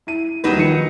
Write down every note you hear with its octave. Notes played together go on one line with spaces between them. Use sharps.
E4 D#7
D#1 F#3 D#4 B4 D#7
D#3 F3 C#7